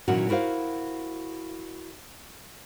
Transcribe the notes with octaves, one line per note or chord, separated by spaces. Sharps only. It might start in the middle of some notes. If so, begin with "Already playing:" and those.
A#2 D#3 E3 F#3 C#4 F#4
E4 F#4 A#4 C5 F5